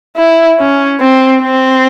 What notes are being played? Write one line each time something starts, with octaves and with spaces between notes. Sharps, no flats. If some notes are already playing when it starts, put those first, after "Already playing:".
E4
C#4
C4
C4